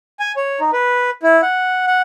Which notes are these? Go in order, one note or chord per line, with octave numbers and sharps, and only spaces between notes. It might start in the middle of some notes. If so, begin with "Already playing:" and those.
G#5
C#5
D#4
B4
E4
F#5
F#5